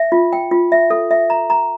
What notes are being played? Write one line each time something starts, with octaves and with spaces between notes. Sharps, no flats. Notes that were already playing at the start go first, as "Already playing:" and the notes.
Already playing: E5
F4
G5
F4
E5
A4
E5
A#5
A#5